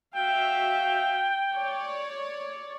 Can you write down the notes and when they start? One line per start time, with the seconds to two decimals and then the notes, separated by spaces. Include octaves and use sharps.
0.15 F#4 E5 F5 G5
1.54 C#5 D5